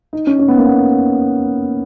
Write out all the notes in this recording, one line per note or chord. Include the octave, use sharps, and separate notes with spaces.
D#4
C#4
C#4
B3
A#3
B3